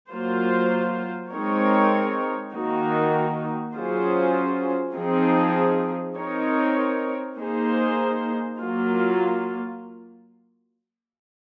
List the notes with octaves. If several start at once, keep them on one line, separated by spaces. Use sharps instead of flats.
F#3 A#3 F4 C5
G#3 C4 D#4 A#4 C#5
D#3 A#3 D#4 F#4
F#3 C#4 F4 G#4 C5
F3 C4 D#4 G#4
C4 D#4 A#4 C#5
A#3 D#4 G#4 C5
F#3 A#3 F4